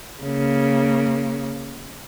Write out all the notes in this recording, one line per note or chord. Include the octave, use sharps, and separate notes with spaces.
C#3 A#3